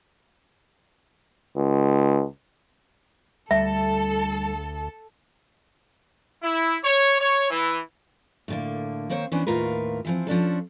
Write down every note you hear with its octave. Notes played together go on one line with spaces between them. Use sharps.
C#2
D2 G3 A4 E5
E4
C#5
C#5
E3
A2 D3 A#3
D#3 A#3 C4 C5 C#5
E3 B3 C#4 D4 C5
D#2 A2 F4 A#4 B4
E3 F3 C4
F3 C#4 D4 A4